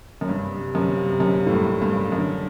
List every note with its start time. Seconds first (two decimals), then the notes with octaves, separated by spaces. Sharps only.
0.21 F#2
0.29 G2 C3
0.75 F#2
1.20 F#2
1.46 A2
1.51 G2
1.82 G2
2.12 F#2 D3